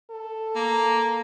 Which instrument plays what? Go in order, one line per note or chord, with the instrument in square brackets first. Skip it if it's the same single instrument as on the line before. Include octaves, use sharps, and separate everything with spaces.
[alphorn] A4
[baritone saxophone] A#3